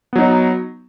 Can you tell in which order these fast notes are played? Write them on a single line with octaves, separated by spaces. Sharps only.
B3 F#3 D#4